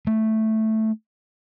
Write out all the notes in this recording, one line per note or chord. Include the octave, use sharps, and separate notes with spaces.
A3